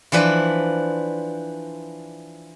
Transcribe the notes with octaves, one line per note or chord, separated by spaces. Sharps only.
E3 F3 D4 B4